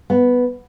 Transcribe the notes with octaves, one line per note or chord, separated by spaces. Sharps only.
B3